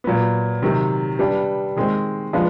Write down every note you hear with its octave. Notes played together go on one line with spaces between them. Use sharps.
A#2 F#3 B3
C3 D#3 F#3
G3 B3 D4
D#3 G#3 C4
F3 G#3 B3 D4 F4